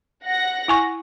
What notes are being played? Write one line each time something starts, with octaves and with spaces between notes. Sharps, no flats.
F#5 A#6
E4 G#5 C#6